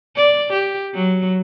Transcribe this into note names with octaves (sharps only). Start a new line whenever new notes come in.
D5
G4
F#3